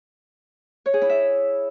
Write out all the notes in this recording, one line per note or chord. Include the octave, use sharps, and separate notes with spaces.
C#5
G#4
E4
E5